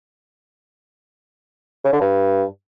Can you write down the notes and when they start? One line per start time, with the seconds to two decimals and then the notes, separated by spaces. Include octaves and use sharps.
1.84 C#3
1.93 D3
2.01 G2